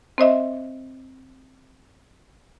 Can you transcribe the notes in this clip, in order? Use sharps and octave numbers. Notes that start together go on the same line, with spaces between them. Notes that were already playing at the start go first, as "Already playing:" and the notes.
C4 C5 D#5 E5